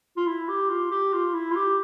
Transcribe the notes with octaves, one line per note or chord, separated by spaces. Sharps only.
F4
E4
G4
F4
G4
F4
E4
F4
G4